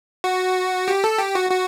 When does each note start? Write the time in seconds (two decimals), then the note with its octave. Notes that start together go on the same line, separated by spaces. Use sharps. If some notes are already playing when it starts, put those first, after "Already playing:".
0.24 F#4
0.88 G4
1.04 A4
1.19 G4
1.35 F#4
1.51 F#4